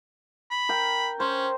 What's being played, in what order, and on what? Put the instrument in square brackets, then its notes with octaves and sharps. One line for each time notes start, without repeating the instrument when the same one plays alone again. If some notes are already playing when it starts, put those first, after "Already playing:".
[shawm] B5
[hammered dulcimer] A#4 G5
[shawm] C#4 [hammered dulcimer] C5